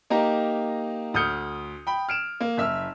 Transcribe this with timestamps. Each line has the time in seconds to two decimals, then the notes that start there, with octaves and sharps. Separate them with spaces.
0.10 A#3 D#4 G4 A#5
1.14 D2 D#6 F6 G6 C#7
1.87 G5 B5
2.09 F6 D7 E7
2.40 A#3
2.58 F#1 E5 E6 F6